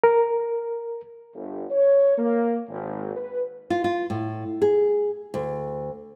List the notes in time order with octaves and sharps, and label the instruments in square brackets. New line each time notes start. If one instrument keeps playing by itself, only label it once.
[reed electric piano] A#4
[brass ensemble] G1
C#5
A#3
G#1
B4
[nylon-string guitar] F4
F4
A2
G#4
D2